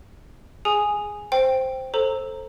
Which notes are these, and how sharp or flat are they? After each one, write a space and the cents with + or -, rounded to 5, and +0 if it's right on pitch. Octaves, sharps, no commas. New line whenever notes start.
G#4 +0 G#5 +0 D#6 -5
C5 +0 G5 +0
A4 +0 C5 +15 A#5 -15